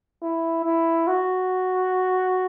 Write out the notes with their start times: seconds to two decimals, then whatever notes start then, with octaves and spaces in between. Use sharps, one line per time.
0.22 E4
0.64 E4
1.07 F#4